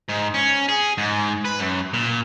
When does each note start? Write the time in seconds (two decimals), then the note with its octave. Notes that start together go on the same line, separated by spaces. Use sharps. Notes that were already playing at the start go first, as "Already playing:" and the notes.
0.09 G#2
0.34 C#4
0.69 G#4
0.98 G#2
1.45 B4
1.60 F#2
1.94 A#2